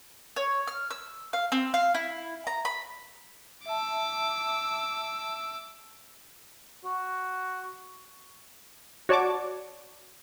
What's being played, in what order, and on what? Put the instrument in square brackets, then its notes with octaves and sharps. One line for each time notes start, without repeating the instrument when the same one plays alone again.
[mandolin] C#5
F6
E6
F5
C4
F5
E4
A#5
B5
[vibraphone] E5 A5 [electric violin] D6 E6
[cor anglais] F#4
[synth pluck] F#4 C#5 D5 A5 C#6 D6